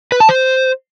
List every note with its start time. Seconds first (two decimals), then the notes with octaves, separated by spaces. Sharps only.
0.12 B4
0.20 A5
0.29 C5